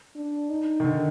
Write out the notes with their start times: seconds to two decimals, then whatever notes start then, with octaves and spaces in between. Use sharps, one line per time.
0.16 D4
0.50 D#4
0.80 D#3
0.84 D3